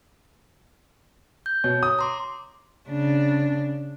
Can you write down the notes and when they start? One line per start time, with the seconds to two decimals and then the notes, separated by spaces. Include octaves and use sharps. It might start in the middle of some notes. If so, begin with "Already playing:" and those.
1.46 G6
1.64 B2 C#5
1.83 D#6
1.99 A#5 C6 D6
2.89 C#3 D4